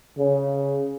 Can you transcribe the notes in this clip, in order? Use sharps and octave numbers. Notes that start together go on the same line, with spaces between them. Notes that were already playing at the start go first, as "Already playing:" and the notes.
C#3